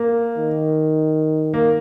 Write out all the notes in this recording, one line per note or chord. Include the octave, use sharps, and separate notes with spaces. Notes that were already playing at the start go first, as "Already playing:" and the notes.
Already playing: A#3
D#3
A#3